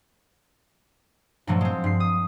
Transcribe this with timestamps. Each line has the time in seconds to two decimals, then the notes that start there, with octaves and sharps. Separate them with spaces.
1.47 G2 A#2 F3 F#3 A3
1.61 G#3 C4
1.84 G2 C7
2.00 D#6